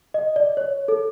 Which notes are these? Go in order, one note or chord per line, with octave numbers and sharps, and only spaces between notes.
D#5
D5
C#5
A4